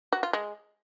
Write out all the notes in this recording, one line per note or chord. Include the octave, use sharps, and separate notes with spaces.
F#4
F4
G#3